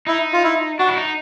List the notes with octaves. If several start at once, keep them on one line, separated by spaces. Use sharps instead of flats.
D#4 E4
F4
E4
D4 F#4
E4
D#4